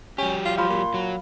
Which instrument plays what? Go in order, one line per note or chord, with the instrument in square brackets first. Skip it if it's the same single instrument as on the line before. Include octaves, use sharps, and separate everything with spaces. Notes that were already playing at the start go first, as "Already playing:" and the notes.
[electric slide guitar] F#3 G4 [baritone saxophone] C#4
[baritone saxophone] F4
[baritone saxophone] F3 [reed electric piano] F5 B5 [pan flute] C6
[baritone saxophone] A#2
[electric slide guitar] F#3